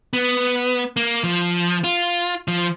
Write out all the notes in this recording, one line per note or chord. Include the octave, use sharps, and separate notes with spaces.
B3
A#3
F3
F4
F3